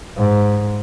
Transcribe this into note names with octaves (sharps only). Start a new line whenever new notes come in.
G#2